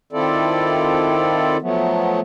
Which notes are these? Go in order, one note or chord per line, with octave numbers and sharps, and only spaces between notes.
D#3 C4 E4 F4 A4 D5
F3 F#3 A3 B3